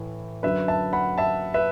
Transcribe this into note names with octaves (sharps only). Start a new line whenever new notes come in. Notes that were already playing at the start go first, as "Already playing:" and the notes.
Already playing: A2 E3
F#2 D3 F#3 B4 E5
E5 A5
F#5 B5
E5 A5
B4 E5